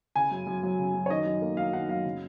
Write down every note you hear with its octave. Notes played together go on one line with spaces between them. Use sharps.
C#3 G#5
F#2
F#2
F#3
C#3
F#2
C#5
D#3 D#5
F#2
A#3
F#3 F5
D#3 F#5
F#2 F5
C#3